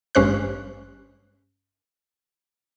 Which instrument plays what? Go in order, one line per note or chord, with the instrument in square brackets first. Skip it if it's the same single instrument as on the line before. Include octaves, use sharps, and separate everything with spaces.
[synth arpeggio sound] G#1 G2 C#4 C5 F#6